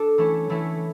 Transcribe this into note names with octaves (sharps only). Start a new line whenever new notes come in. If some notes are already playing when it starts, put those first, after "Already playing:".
Already playing: D4 A4
E3 A3 C#4 E4
E3 A3 C#4 E4